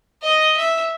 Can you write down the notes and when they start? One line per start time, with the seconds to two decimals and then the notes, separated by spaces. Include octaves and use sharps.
0.22 D#5
0.57 E5